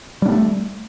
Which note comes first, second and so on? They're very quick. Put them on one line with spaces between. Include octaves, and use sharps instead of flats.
G3 D4 A#3 A3